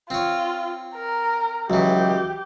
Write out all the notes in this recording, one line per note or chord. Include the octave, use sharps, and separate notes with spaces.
C4 F4 C#5
A#4
C#2 E3 F#3 G4